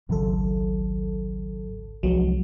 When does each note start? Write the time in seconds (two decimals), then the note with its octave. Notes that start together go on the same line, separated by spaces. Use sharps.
0.09 G#1 C#2 G#2 D#3 F#3 A4
2.03 C2 F3 F#3 G#3